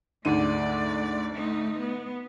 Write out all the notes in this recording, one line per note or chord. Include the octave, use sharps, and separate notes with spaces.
D2 G#2 A3 D5 D#7
A3 D#4
B3